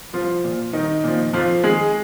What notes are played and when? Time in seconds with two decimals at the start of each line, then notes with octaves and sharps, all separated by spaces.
0.13 C2 F3 F4
0.44 A#2 F3
0.73 C2 D#3 D#4
1.03 A#2 F3
1.33 F2 F3 F4
1.63 D#3 G#3 G#4